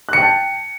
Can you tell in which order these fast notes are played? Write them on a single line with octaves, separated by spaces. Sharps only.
F#6 C#7 G5 A5